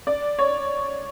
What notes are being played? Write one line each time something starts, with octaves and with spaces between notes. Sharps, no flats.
D5
C#5